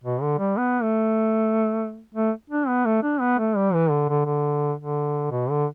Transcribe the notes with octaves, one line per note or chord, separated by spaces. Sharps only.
B2
D3
G3
B3
A3
A3
D4
B3
A3
D4
B3
A3
G3
E3
D3
D3
D3
D3
B2
D3